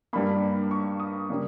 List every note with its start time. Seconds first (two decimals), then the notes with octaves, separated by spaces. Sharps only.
0.13 G2 G3 A#3 B5
0.71 C#6
1.00 D#6
1.30 C#3 G3 A#3